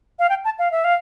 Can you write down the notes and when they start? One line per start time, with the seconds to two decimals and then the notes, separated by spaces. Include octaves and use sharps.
0.19 F5
0.29 G5
0.45 A5
0.59 F5
0.71 E5
0.84 F5